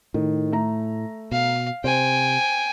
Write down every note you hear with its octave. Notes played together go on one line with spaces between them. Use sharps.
A2 D#3
A3 A#5
B2 F5
C3 C5 G5 G#5